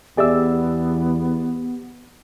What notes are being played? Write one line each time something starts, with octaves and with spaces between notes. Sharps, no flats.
E2 B3 G4 G#4 D5 E5 E6